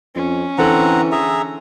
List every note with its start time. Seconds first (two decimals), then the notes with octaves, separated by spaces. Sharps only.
0.15 F2 C#4
0.58 D3 E3 C4 A4 F#5 A#5 F#7
1.12 G#4 E5 A#5